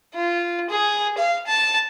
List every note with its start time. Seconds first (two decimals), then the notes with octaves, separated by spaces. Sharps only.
0.14 F4
0.70 G#4
1.17 F5
1.47 A5